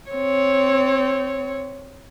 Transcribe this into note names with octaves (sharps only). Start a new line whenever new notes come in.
C4 C#5